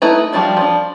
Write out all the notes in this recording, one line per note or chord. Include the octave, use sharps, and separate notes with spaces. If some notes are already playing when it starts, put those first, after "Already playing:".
A3 D#4 E4 B4 A#5
F3 G3 A3 D4 F#4
F3 D4